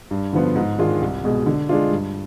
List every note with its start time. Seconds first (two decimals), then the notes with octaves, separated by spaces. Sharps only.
0.11 G2
0.33 D3 F3 B3 F4
0.56 G#2
0.78 D#3 G#3 D4 F4
1.01 C2
1.24 B2 G#3
1.46 D3
1.69 G#3 D4 F4
1.91 G2